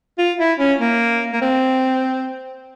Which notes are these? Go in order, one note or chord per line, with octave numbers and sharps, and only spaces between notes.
F4
E4
C#4
A#3
A#3
C4